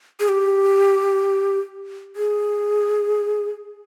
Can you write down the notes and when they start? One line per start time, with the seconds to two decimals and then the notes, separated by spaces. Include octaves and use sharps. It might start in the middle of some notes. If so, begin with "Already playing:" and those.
0.20 G#4
0.29 G4
2.16 G#4